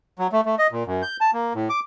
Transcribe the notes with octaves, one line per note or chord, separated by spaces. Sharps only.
F#3
A3
A3
D#5
A#2
F#2
G6
A5
A#3
A2
D6